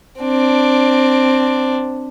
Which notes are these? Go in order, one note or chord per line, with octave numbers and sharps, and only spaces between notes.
C4 D4